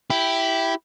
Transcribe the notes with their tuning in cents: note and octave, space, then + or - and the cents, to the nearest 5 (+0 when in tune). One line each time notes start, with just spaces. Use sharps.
E4 +5 G4 -5